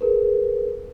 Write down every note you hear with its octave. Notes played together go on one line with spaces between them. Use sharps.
G#4 A#4 B4